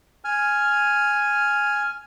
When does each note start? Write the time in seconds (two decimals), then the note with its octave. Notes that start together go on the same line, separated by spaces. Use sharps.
0.25 G#5 F6